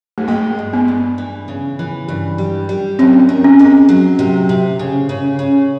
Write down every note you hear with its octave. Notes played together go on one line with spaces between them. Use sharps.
A3
G#3 A#3
G2
B3
G2
E3
C#3
E3
G2
G3
G3
F#2 C4
D#3
C#4
G#3
F#3
C3
C3
C#3
C#3
C#3